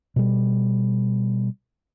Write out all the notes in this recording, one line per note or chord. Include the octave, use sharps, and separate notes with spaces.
B2 G3